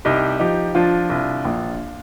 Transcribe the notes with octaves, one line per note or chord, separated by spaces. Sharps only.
C2 D#4 G4
F3 D#4 G4
F3 D4 F4
C2
A#1